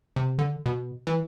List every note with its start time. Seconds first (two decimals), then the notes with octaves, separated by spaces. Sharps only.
0.16 C3
0.39 D3
0.66 B2
1.07 E3